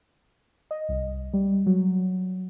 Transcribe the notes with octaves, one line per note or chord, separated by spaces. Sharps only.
D#5
C2
G3
F#3